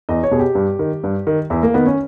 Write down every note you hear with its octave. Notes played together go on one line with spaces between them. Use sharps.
E2 D#5
C#5
B2 G#4
G4
G2
D#3
G2
D#3
E2 E4
A#3
D#3 B3
C#4